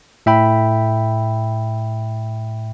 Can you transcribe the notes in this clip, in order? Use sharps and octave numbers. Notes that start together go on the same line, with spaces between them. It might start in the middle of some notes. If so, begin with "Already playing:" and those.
A2 E5 G5 B5